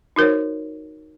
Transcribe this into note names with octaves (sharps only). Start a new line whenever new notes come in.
D#4 F#4 A#4 C5 C#5